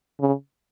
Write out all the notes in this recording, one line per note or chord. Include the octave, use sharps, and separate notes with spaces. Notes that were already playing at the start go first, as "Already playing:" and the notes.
C#3